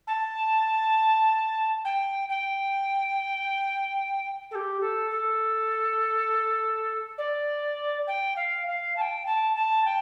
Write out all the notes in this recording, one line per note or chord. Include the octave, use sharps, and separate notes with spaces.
A5
G5
G5
A4
G4
A4
A4
D5
G5
F5
F5
A5
G5
A5
A5
G5